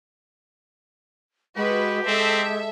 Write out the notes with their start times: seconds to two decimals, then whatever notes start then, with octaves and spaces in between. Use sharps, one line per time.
1.56 G#3 F#4 G4 B4
2.06 G#3 C4 A4 E5